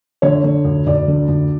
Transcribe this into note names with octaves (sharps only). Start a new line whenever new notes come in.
D3 C#5
D3
D2
D2 D5
D3
D2